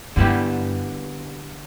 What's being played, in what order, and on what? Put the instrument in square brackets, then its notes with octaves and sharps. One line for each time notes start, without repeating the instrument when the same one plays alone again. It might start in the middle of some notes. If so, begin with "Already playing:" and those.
[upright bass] G2 [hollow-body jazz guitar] D3 G3 B3 E4 G4